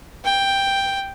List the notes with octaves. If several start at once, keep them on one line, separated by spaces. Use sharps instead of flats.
G5